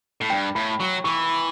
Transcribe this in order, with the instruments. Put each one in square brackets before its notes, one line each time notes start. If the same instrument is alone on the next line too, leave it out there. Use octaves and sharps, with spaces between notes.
[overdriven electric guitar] A2
[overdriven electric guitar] G2 [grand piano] G5
[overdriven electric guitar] A2 [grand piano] B5
[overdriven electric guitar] F#3 [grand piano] C#6
[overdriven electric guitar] E3 [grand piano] C#6